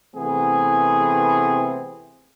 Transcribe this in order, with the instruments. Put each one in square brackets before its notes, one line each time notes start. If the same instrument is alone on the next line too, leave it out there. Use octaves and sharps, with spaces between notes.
[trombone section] C3 E3 A3 B3 C4 G#4